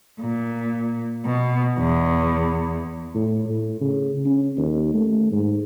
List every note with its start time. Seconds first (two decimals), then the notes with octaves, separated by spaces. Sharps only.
0.20 A#2
1.25 B2
1.79 E2
3.15 A2
3.49 A2
3.81 C#3
4.26 C#4
4.57 D#2
4.94 A3
5.31 G#2